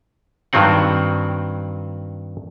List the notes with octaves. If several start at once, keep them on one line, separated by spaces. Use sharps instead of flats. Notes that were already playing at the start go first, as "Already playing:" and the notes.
G2 D#3 F#3 C4 F#5